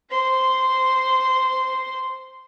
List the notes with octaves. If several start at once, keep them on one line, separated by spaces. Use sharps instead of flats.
C5 C6